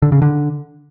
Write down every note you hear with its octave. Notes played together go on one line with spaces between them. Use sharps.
D3
C#3
D3